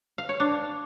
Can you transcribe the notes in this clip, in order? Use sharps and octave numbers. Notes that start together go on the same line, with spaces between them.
F5
C#5
D4